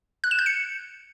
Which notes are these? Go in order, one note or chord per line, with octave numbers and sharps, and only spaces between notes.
F#6
E7
G6
C#7